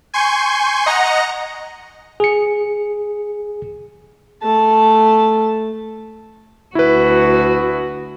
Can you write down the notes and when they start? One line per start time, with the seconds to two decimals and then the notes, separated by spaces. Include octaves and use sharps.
0.14 G#5 C6 C#6 G6
0.86 D#5 F#5 A#5 A#6 C#7
2.20 G#4 C#7
4.43 A3 A5
6.75 D2 E4 F#4 B4